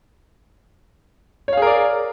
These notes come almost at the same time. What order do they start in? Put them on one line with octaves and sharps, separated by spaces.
C#5 F5 G#4 A#4 D5